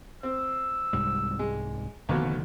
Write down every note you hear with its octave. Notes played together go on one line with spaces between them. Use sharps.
C4 E6
C2 G#2 G3
G#3
F1 D#2 B2 D3 D#3